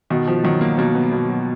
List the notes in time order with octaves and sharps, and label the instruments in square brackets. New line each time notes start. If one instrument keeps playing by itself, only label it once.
[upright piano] B2 [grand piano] D#3
[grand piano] F3
[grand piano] D#3 [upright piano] F#3
[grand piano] A#3
[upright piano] B2 [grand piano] A#3
[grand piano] B3
[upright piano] B2
[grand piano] F#3